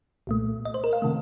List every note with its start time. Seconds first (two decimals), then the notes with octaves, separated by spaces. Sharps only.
0.27 C2 A#2 A3
0.65 D#5
0.74 C5
0.84 A#4
0.93 F5
1.02 C3 D#3 A3